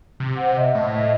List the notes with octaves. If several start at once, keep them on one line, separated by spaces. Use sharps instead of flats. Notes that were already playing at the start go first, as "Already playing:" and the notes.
C3
C5 F#5
D#5 E5
A2